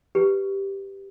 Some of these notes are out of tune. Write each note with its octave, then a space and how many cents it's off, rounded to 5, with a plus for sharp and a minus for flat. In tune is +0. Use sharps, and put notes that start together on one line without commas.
G4 +0 B4 +0